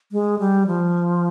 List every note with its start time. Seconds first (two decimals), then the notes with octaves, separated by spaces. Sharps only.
0.12 G#3
0.39 G3
0.67 F3